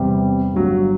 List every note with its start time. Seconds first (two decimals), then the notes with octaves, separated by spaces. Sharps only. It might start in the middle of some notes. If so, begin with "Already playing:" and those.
Already playing: E2 C3 G3 C4
0.53 G1 G2 F#3